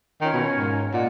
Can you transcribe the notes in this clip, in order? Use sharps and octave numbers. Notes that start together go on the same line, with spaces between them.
D#3 C#4 F4 A#4 C#5
B2
G#2
A#2 D#5 F#5